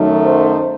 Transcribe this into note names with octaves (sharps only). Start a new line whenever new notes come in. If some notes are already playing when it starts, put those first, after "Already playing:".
Already playing: F#2 D#3 F#3 A3 D#4
C5